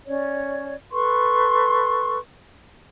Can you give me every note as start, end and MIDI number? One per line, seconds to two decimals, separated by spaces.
0.06 0.74 61
0.06 0.74 73
0.06 0.74 74
0.92 2.17 69
0.92 2.17 71
0.92 2.17 84
0.92 2.17 85